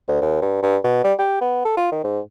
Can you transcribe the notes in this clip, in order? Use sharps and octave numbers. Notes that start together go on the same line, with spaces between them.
D2
D#2
G2
G2
B2
G3
G4
B3
A4
F4
D#3
G#2